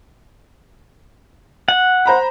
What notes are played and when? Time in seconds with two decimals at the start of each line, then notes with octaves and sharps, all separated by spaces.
1.68 F#5
2.06 C5 A#5 B5